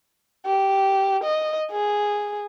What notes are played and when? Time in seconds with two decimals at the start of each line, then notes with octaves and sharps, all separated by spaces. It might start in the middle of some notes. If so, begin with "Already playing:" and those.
0.46 G4
1.24 D#5
1.72 G#4